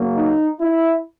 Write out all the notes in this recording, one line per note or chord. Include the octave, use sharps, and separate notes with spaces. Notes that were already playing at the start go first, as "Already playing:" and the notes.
Already playing: C#3 F#3 A#3
D#4
E4